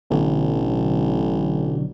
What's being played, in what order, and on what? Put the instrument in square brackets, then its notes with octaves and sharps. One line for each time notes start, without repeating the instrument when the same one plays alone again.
[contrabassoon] A1 [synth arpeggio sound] B2 D3 F#3